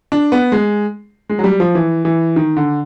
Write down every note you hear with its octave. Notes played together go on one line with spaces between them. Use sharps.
D4
B3
G#3
G#3
F#3
G3
F3
E3
E3
D#3
D3